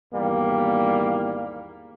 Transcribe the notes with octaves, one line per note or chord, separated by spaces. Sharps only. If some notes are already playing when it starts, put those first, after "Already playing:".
G#1 E2 G3 A#3